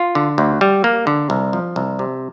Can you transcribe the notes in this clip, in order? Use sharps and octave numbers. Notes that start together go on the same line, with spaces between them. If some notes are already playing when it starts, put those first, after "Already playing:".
Already playing: F4
D3
D2
G3
A#3
D3
C2
F3
C2
C3